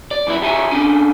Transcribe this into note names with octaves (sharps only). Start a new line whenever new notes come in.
D5
F#2 E3 E4
D#3 G4 E5 G#5
D3 C#4 D4 G#5